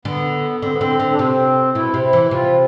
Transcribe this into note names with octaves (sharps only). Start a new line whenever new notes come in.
D3 B3
D3 C4
B3
D3 C4
D3
D4
C3 C4
B2 E4
C3
E4
E3
C3 F4